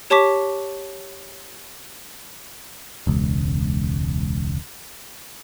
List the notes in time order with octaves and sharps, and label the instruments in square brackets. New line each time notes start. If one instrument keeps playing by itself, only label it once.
[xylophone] G4 C#5 A5 C#6 D6 B6
[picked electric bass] E1 C#2